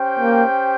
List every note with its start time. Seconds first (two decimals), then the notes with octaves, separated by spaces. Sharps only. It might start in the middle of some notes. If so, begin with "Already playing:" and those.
Already playing: C#4 G4 C5 G5
0.20 A#3